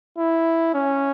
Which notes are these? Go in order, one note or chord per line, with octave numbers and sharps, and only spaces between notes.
E4
C#4